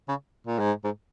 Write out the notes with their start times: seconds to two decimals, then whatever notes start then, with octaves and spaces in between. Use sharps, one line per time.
0.09 C#3
0.47 A#2
0.59 G#2
0.84 G#2